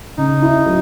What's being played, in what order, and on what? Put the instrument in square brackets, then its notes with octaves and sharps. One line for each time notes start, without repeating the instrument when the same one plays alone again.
[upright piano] C#3 [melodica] D#4
[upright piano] E4
F#3